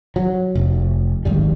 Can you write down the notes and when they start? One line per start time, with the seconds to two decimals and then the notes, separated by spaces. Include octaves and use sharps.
0.16 F#3
0.55 F1
1.25 D1 G#1 G3